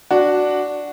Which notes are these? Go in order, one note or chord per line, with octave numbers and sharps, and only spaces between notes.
D4 F#4